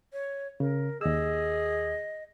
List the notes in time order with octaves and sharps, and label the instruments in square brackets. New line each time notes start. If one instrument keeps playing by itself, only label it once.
[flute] C#5
[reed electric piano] C#3 [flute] A#4
[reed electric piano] D#2 E6 [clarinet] G#4 [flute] D#5